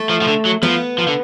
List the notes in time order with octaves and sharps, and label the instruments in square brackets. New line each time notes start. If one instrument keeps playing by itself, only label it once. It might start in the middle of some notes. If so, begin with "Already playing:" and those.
Already playing: [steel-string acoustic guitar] A3 A4
[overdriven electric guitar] F3
F3
D3
F#3
[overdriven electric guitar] F3 [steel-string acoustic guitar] B3 B4
[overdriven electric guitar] F3
D3